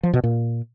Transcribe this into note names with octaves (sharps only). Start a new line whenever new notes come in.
F3
B2
A#2